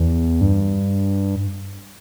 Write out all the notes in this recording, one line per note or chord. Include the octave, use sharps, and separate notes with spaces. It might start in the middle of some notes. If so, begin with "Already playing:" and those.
Already playing: E2
G2